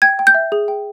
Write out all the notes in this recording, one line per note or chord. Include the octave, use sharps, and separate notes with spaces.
G5 G#6
G5
G6
E5
G#4
G5